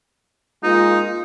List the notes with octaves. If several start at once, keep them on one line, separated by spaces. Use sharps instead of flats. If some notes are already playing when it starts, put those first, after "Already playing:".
G#3 A#3 D#4 F4